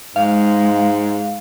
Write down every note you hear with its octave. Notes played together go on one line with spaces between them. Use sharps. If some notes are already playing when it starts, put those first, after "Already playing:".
G#2 G#3 F5